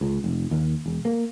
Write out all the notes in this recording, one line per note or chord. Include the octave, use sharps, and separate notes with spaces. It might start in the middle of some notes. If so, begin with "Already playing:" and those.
C#2
F1
D#2
E1
A#3